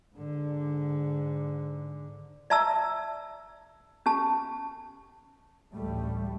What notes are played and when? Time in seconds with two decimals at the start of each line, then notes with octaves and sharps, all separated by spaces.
0.15 G#2 D3
2.50 D5 E5 A5 A#5 E6
4.06 C#4 G4 A5
5.72 A1 D2 G3 A3